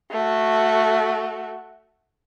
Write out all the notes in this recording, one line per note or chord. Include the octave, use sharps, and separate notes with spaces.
A3 F#4